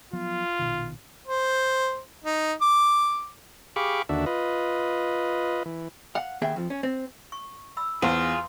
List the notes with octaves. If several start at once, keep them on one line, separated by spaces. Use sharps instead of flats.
F3 F#3 B3 F4
A#1 B2 D#3
C5
D#4
D6
G4 G#4 F5 B5 C#6 D6
D#2 D3 D4 F#4 E5
F4 B4 D#5
E3
F5 F#5
D#2 B3 G#4 E5 G5
F2 F3
C#4
C4
C#6
B5 E6
E2 F4 G#4 C5 F5 G#5 D6